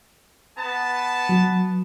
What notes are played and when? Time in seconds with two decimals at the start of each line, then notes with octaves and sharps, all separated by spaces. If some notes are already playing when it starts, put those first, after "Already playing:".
0.58 B3 B4 A5
1.29 F#3